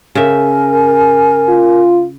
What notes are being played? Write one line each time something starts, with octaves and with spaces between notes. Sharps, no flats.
C#3 A#4 E5 G#5
F4